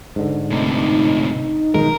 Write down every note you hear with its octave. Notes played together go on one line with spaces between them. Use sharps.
G#2 D3
A2 C3 D#4
B1 D#3 G#3 A#4